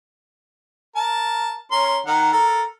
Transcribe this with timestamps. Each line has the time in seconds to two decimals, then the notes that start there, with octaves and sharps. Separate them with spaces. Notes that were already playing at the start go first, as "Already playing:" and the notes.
0.96 A#4 A5
1.72 C#4 A#4 C6
2.06 D#3 A#4 F#5
2.32 A4 A#4